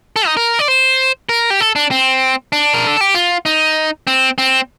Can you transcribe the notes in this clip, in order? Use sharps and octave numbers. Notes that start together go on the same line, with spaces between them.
A4
D#4
A#4
D5
C5
A#4
G4
A4
D4
C4
D4
A#4
A4
G4
F4
D#4
C4
C4